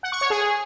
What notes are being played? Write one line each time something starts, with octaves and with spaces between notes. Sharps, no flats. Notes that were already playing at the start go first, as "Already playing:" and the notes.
F#5
C#6
C#5
G#4